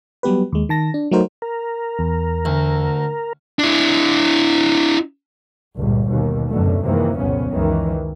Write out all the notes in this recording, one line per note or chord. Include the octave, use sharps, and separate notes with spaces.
F#3 G3 B3 G4 B4
D#2 G#3
D#3 A5 A#6
D4
F#3 A3 D#4 F#4 A#4 C5
A#4
E2
D2
D4 E4
G1 C#2 A#2
D#2 B2
C#2 F#2 B2 D3 A3
F#2 C3 D#3 E3 G#3 A#3
C2 F2 A#2 C#3 B3 C#4
C#2 F#2 D#3 E3